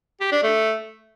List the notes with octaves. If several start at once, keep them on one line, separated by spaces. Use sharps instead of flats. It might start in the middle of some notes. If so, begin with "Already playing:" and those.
G4
D4
A3